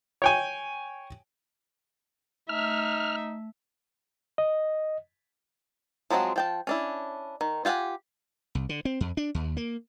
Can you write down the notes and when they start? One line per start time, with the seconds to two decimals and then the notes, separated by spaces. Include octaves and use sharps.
0.22 C#5 G5 G#5
2.49 A3 D#4 E5 F6
4.38 D#5
6.10 F3 F#3 G#3 C4 F#4
6.36 F3 G5 A5
6.67 C#4 D4 E4
7.41 D#3
7.65 F4 G4 F5 F#5 G#5
8.55 C2
8.69 D3
8.85 C4
9.01 F2
9.17 D4
9.35 D#2
9.57 A#3